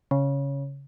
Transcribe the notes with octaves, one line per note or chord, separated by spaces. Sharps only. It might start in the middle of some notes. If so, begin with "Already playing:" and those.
C#3